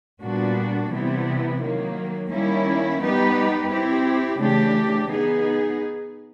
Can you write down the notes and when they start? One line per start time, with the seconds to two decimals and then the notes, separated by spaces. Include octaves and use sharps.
0.22 A#2 G3 B3 D4 F#4
0.92 C3 E3 G3 B3 E4
1.61 D#3 F#3 A#3
2.31 D#3 G3 A#3 C#4 E4
3.00 G3 B3 D#4 G4 B4
3.70 C4 E4 G4
4.40 C#3 E3 A3 D4 G4
5.10 B3 D#4 G#4